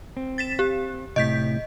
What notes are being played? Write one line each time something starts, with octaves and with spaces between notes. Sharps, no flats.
C4
A6 B6 E7
G4
A2 C3 D#5 G6 B6